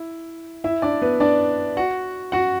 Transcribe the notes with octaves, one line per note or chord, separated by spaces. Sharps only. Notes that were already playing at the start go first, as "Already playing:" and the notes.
Already playing: E4
E4 E5
D4 D5
B3 B4
D4 D5
F#4 F#5
F#4 F#5